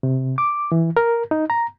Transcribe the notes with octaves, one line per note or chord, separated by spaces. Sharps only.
C3
D6
E3
A#4
D#4
A#5